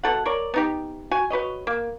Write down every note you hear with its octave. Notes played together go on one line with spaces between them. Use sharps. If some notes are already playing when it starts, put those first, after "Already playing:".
B2 D#4 A4 F#5
A#4 C#5 D5
B3 D#4 G4
F#4 G#5
F#4 B4 C#5 D#5
A#3